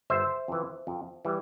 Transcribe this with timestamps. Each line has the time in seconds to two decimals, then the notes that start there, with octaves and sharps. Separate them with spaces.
0.10 G1 C5 E5
0.48 F2 E3
0.87 F2
1.25 E3 G3